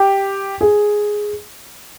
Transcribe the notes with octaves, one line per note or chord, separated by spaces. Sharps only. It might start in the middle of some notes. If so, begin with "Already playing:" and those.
Already playing: G4
G#4